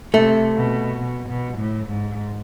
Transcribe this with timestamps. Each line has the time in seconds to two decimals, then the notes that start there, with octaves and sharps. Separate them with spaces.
0.13 C3 A3
0.56 B2
1.00 B2
1.29 B2
1.58 A2
1.86 G#2